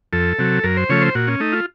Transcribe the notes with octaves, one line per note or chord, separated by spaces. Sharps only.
F2 A4
C3 F#3
F#2 A#4
C5
C#3 F3 A3 C#5
C5
A#2 F#4
C#4
A3 D#4
F4